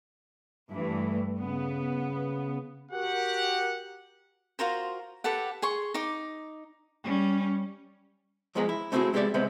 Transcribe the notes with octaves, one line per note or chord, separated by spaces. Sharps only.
G2 E3 A3
C#3 B3
F#4 G4 A#4 F#5
F4 F#4 A#4 C5
G4 A4 B4 F#5
G#4 C6 C#6
D#4 D6
G3 C#4
E2 F3 G#3 B3 G#4 A#5
E4
A3 C4 D#4 E4 F#4 G#4
G#3 B3 G4 A4 D5 E5
C#2 C3 G#3 B3 C5